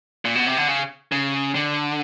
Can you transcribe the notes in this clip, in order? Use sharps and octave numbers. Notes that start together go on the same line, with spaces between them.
A#2
B2
C3
D3
C#3
C#3
D3